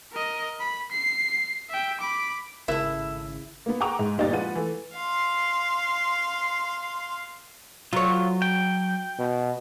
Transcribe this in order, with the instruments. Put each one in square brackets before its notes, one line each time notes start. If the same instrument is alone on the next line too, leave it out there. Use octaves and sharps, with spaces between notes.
[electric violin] A#4 D#5
B5
C7
E5 G5
B5 D6
[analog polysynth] G#1 C#3 [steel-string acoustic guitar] A2 E5 [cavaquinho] E4 [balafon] A#4
[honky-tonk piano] A#3 B3
F#5 G5 A#5 C#6 D6 F7
G#2
G1 A#2 D#4 G4 D5 A6
F3 G#3 B4 F#5 D#7
E3 A3
[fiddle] F5 C6
[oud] F#3 C#5 [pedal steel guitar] F4
[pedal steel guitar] G5
[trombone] B2